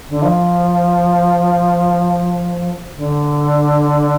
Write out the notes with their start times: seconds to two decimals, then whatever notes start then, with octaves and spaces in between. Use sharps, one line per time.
0.09 D3
0.22 F3
2.96 D3